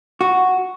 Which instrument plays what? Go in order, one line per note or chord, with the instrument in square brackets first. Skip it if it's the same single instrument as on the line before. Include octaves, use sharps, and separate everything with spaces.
[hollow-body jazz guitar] F#4